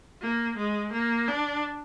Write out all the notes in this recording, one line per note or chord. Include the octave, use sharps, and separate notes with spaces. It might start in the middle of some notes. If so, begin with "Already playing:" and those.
A#3
G#3
A#3
D4